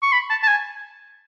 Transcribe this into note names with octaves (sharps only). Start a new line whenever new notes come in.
C#6
B5
A5
A5
G#5